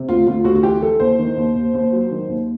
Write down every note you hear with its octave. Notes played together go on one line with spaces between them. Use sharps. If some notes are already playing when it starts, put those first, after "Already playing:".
Already playing: C3
D2 F4
D2 F4
D2 F#4
F#4
E3 G4
E3 A4
D#2 C5
D#3
D#2
D#2
D#2
F#3
D#3
D#2